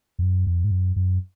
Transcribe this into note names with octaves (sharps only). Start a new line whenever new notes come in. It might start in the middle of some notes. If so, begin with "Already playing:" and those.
F2
F#2
F2
G#2
F#2
F#2